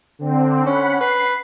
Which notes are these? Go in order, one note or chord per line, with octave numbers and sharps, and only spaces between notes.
D3 C4
C#4 F#5 B5
B4 C7